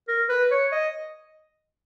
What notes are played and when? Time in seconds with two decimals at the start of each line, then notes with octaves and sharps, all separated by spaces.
0.08 A#4
0.29 B4
0.51 C#5
0.72 D#5